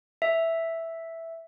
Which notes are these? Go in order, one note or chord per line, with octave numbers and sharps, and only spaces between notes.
E5